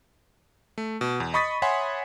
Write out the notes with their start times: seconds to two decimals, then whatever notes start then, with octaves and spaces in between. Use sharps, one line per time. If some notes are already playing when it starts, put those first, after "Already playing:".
0.78 A3
1.01 B2
1.20 E2
1.34 D#5 B5 C#6 D#6 A6 B6
1.62 C#5 E5 F#5 G#5 B5 C6